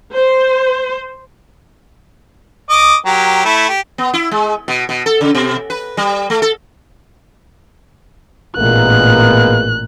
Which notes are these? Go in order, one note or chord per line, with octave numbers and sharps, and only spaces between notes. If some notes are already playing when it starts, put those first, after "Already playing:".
C5
D#5 D6
F#3 G4 A#4
A3 E4
G4
B3
E4
G#3
B2
B2
A4
C#3
B2
B4
G3
A3
A4
A1 A#2 G#3 A#3 B3 F#6